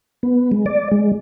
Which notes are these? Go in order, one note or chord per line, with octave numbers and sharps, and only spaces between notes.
B3
G#3
D5
G#3